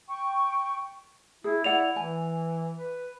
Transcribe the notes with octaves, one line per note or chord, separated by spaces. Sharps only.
G5 C#6
E4 G#4
E4 D5 F#5 F7
E3 G#5
B4